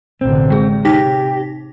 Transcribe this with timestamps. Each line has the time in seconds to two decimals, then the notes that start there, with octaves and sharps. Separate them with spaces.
0.21 A1 B2 D3 C4
0.50 C3 G#3 G#4
0.85 D#4 G4 A#6 B6